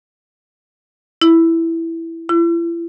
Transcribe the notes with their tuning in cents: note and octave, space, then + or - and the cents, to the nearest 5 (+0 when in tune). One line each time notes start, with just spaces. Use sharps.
E4 +5
E4 +40